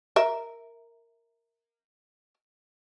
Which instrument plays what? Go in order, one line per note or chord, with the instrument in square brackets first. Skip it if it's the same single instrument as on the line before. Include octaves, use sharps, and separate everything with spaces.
[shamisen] A#4 E5